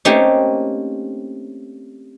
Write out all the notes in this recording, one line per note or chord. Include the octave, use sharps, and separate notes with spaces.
A3 A#3 C4 C#4 D#4 G4